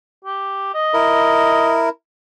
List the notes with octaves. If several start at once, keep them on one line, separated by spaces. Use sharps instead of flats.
G4
D#5
E4 A#4